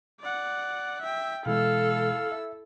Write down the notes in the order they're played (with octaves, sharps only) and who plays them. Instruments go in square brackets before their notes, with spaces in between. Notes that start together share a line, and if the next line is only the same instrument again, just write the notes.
[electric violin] D5 F#5
E5 G5
[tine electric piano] B2 E3 G#3 [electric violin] E4 E6 [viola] A4 [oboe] F5
[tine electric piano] E5